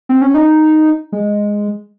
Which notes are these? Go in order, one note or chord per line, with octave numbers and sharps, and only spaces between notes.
C4
C#4
D#4
G#3